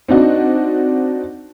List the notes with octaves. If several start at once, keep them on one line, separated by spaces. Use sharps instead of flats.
C4 D4 D#4 F#4